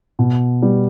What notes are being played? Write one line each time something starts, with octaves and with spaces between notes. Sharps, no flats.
B2
G3 B3